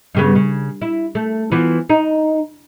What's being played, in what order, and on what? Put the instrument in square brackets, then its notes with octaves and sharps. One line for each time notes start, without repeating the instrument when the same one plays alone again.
[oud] G2 C#3 B3
C#3
E4
A3
E3 F3 B3
D#4